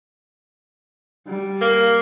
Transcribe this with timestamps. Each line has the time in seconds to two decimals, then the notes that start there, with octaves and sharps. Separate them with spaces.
1.27 G3
1.61 A#3